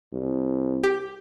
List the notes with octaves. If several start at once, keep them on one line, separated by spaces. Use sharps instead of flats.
C2
G4